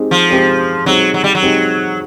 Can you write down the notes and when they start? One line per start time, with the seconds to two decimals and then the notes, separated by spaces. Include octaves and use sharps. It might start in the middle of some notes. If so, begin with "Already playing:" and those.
Already playing: G#3 C4 D#4 G4
0.11 F3
0.29 G#3 C4 D#4 G4 C5
0.86 F#3 G#3 C4 D#4 G4 C5
1.14 F#3
1.24 G3
1.35 F#3
1.42 G#3 C4 D#4 G4 C5